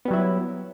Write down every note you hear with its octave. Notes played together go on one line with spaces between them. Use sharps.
F#3 G3 B3 E4